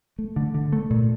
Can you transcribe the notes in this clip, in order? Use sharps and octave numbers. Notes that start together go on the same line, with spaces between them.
A3
D3
D3
A3
A#2